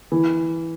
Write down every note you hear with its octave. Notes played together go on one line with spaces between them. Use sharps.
E3